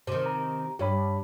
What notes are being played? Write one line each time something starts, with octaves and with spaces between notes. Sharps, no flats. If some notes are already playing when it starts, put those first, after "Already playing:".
C3 D#3 C5
A#5
G2 G4 C#5 B5